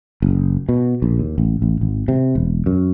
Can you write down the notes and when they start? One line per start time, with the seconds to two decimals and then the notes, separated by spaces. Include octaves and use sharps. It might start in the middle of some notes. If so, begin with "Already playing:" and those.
0.22 F#1
0.69 B2
1.02 A#1
1.19 D#2
1.38 A1
1.62 A1
1.81 G#1
2.08 C3
2.35 E1
2.66 F#2